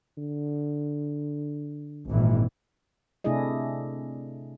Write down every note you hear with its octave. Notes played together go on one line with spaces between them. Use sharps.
D3
G#1 A#2 E3
C3 A3 D4 E4 G#4 D#5